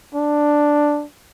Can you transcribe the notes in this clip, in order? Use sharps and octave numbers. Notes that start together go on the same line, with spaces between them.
D4